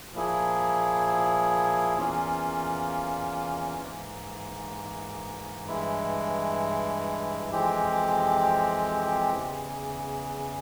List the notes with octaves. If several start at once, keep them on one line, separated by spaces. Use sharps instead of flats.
A#2 F3 A#3 E4 G#4
E2 E3 A#3 C#4 F4
G#2 E3 A#3
G2 E3 G#3 E4
F2 E3 G#3 C4 G4
E2 C#3 E3